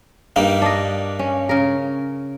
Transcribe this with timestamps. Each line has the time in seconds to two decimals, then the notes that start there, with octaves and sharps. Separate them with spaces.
0.36 G2 G3 A#3 D#4
0.62 D4 D#5
1.19 C#4
1.49 C#3 A#4